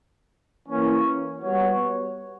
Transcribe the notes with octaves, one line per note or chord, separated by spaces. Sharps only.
E3 A#3 C#4
G3 B3 F#4 C#5